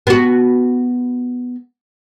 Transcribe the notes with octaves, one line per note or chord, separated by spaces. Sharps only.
B3 F#4